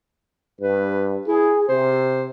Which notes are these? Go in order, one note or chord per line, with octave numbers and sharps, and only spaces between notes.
G2 B4
E4 G#4
C3 C5